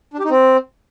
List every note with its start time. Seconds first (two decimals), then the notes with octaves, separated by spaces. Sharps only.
0.14 D4
0.19 G4
0.25 D#4
0.30 C4